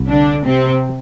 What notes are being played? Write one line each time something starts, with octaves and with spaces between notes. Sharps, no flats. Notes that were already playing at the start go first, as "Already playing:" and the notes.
Already playing: C2
D3 D4
C3 C4